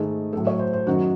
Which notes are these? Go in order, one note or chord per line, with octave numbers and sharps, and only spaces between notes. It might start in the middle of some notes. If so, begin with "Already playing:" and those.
Already playing: G#2 D#3 A3 G#4
A2 F#3 A3 A4
C#5
C5
C5
F#2 D#3 F#3 F#4